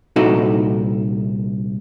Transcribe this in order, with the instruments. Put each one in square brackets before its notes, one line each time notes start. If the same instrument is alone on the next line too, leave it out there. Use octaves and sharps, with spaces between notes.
[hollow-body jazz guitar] C2 A#2 D#4 F#4 A4 D#5